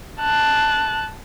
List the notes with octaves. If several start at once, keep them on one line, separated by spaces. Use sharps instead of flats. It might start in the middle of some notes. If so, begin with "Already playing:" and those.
A5 F#6